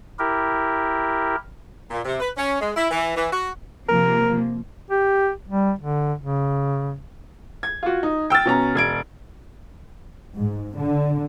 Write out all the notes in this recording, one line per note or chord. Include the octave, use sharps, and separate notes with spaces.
E4 G4 A#4
A#2
C3
B4
C#4
G#3
E4
E3
E3
F#4
C3 F3 A#3 A#4
G4
G3
D3
C#3
G#6
F4 F#4
D#4
G5 E6 F6 A6
B2 C#4 A#5
E1 G#6 D7
G#2
D3